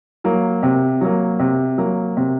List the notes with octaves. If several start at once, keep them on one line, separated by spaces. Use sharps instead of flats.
F#3 A#3
C3
F#3 A#3
C3
F#3 A#3
C3